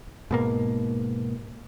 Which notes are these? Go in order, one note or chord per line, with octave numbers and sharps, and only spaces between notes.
G#2 B2 A#3